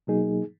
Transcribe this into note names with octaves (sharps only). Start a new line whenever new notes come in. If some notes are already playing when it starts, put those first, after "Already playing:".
B2 F#3 A#3 D#4 G#4